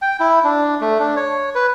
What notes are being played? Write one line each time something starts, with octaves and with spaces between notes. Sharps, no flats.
G5
E4
D4
A3
D4
C#5
B4